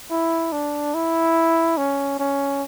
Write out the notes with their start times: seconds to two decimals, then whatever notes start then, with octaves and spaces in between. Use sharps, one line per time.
0.10 E4
0.53 D4
0.94 E4
1.78 C#4
2.20 C#4